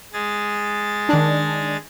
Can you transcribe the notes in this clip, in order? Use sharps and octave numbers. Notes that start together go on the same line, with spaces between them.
G#3 G#4 A6
D#3 D4